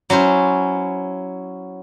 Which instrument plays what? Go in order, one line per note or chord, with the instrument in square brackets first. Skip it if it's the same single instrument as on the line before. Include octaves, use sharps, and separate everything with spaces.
[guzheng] F#3 C#4 E4 C5